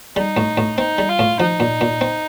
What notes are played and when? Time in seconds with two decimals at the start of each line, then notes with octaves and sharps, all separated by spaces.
0.16 G3 D#4
0.37 A2
0.57 A2
0.78 C4 D#4
0.98 G3
1.09 F4
1.19 A2
1.40 F3 D#4
1.60 A#2
1.81 A#2
2.01 C4